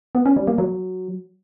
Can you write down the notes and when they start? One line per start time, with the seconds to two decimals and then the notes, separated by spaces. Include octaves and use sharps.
0.15 B3
0.26 C#4
0.36 G3
0.47 A#3
0.58 F#3